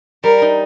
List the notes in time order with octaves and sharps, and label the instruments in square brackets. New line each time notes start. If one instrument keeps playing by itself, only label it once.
[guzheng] G3 [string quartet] A#4
[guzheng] D#4